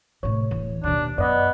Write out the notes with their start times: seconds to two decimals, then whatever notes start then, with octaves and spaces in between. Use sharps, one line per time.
0.23 A2 C3 C#5
0.51 D1 E3
0.84 D#2 B2 D4
1.18 F#2 B3 D5 D#5